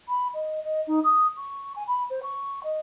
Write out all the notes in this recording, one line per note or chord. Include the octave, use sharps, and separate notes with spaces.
B5
D#5
D#5
D#4
D#6
C#6
G#5
B5
C5
C#6
D#5